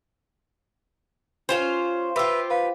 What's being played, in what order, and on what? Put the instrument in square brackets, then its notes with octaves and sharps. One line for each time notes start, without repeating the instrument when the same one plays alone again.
[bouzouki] C#4 F4 F5 [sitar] C5
[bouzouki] F4 G4 [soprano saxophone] B4 [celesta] E5 E6
[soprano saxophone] B4 [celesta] F5